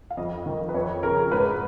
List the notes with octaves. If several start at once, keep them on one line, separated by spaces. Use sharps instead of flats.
F5
F2 D#5
D#3
B4
F2 C#5
C#3 A#4
G#2 B4